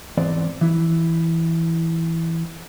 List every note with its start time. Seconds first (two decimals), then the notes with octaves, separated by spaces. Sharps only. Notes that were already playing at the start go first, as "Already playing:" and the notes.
0.17 E2 G#2 E3 C4 D5
0.61 E3 E4